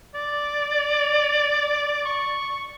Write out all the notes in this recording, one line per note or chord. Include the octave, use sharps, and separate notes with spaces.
D5
C#6